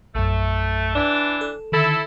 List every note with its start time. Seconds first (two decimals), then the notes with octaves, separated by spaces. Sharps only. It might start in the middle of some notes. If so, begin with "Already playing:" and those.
0.15 A#1 F#2 A3
0.95 E3 D4
1.41 A4
1.72 D3 D#3 E4 A4